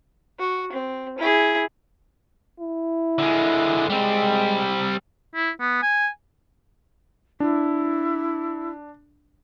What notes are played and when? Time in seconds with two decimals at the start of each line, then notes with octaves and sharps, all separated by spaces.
0.39 F#4
0.73 C4
1.19 E4 G#4
2.60 E4
3.18 D3 G#3
3.90 G3 G#3 C4
5.35 E4
5.61 B3
5.83 G#5
7.40 D4 E4